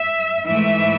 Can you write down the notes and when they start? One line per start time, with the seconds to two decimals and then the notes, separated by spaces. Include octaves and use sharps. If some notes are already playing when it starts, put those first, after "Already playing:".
Already playing: E5
0.48 G#2 E3 A3 E5